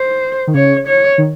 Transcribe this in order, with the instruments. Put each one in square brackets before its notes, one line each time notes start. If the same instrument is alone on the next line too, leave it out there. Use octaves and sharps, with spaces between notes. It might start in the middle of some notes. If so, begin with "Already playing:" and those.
Already playing: [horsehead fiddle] C5
[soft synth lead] D#3
[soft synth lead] C#3 [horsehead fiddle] C#5
[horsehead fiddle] C#5
[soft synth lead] D#3